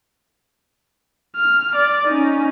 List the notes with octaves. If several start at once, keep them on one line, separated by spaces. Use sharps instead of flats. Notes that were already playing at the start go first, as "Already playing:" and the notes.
F6
D5
C#4 D#4